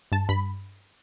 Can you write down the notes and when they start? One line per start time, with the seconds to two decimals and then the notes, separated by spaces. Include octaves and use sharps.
0.12 G2 A5
0.29 G2 B5